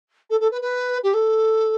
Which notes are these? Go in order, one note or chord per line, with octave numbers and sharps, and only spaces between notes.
A4
A4
B4
B4
G4
A4